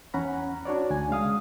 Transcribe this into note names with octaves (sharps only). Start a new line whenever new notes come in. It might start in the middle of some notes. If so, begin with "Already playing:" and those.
E2 C#4 F#5 A#5 B5
D4 F#4 C#5 D5
D2 G#5
C#3 G#3 F5 D#6